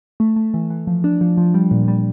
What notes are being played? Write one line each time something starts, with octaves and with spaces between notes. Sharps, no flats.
A3
A3
E3
E3
F3
D4
F3
F3
G3
A#2
G3